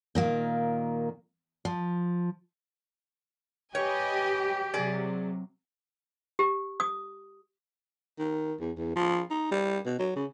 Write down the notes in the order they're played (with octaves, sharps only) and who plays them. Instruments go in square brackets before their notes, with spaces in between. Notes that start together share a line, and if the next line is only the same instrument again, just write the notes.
[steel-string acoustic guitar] A#2 D#3 A#3
F3
[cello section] G4 [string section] B4 D#5 G#5 [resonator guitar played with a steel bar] C#5 [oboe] G5
[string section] C3 F#3 [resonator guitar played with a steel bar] G#4 D5
[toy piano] G4
D#6
[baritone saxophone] D#3
E2
E2
F3
D#4
G3
B2
F#3
C#3